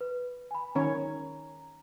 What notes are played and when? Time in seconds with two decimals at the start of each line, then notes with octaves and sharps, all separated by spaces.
0.01 B4
0.51 G#5 B5
0.75 D#3 C#4 C#5 A#5